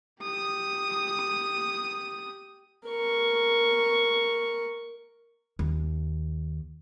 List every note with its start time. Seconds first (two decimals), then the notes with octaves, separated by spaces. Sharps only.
0.23 G4 D#6
2.88 A#4 C#6
5.59 D#2